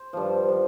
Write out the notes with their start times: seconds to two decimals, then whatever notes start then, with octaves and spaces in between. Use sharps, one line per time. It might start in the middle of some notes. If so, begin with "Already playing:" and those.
Already playing: C5
0.13 G2 F3
0.48 F3